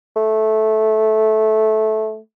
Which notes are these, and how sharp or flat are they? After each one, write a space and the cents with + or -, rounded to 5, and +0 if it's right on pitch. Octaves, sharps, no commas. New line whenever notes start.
A3 -15